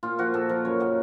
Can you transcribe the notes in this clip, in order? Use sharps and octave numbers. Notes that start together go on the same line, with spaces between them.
A#2 F4
F3 F#4
A#2 A4
F3 A#4
F#2 C#5
C#3 F#3 D#5